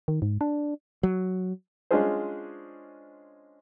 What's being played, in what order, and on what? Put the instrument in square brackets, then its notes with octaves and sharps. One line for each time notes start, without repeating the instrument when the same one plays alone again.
[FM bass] D#3
G#2
D4
[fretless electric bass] F#3
[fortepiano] G#3 C#4 D4 F4 G#4 C5